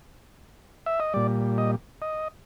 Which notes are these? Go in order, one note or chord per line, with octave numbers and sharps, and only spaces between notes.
E5
D#5
A#2 G3 D5
D#5
D#5